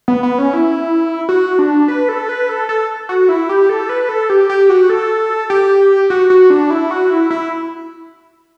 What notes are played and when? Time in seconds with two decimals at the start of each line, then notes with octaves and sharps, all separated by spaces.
0.08 B3
0.23 B3
0.38 C#4
0.53 E4
1.29 F#4
1.59 D4
1.88 B4
2.09 A4
2.29 B4
2.49 A4
2.69 A4
3.09 F#4
3.29 E4
3.49 G4
3.69 A4
3.89 B4
4.09 A4
4.30 G4
4.49 G4
4.69 F#4
4.90 A4
5.50 G4
6.10 F#4
6.30 F#4
6.50 D4
6.70 E4
6.91 F#4
7.10 E4
7.30 E4